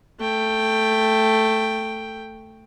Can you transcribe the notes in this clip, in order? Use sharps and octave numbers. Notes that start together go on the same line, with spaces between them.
A3 G5